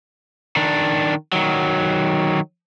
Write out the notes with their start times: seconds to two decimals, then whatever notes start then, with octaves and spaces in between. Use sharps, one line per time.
0.56 D#3 D4
1.33 D#3 F#3